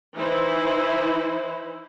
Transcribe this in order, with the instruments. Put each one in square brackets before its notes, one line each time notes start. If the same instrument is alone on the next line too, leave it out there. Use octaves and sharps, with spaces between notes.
[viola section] E3 D#4 E4 C5